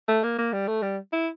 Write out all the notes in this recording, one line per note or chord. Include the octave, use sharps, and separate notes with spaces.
A3
A#3
A#3
G3
A3
G3
E4